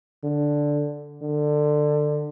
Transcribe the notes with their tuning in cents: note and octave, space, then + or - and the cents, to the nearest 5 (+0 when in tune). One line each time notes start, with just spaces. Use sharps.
D3 +0
D3 +20